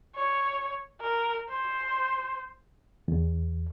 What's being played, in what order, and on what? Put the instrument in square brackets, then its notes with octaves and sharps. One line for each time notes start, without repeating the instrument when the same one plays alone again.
[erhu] C#5
A#4
C5
[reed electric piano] E2